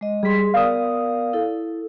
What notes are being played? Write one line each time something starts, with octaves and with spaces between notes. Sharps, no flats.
G#3 D#5
G3 G#4 C6 B6
B3 A#4 D5 F5 D#6
E4 A4